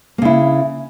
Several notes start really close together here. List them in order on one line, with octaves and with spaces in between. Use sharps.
A#3 C#3 E4